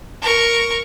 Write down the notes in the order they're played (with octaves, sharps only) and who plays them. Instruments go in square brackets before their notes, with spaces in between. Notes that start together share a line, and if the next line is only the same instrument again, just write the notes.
[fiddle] A#4 C#6